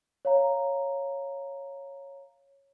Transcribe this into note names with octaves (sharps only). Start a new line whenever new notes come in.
C#5 F5 A#5